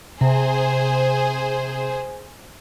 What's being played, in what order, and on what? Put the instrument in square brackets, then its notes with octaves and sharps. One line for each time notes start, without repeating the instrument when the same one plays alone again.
[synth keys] C3 [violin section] G#4 C5